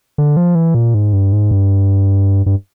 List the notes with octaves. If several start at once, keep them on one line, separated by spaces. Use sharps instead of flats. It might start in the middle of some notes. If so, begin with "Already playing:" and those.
D3
F3
E3
A#2
G#2
G2
G#2
G2
G2